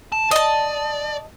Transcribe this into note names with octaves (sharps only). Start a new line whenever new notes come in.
A5
D5 D#5 A5